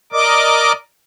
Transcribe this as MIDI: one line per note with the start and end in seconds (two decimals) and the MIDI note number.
0.12 0.72 70
0.12 0.72 74
0.12 0.72 75
0.12 0.72 86